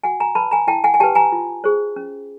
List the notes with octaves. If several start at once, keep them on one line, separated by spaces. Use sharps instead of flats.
F#4 F#5 G#5
G#5 A#5
B4 A5 B5
G#5 A#5
E4 G5 A5
F#5 G#5
G#5
G4 B4 G5 A5
G#5 A#5
F4
G#4 C5
C#4